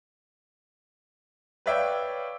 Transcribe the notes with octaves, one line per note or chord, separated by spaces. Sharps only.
B4 C#5 D5 E5 F5 G5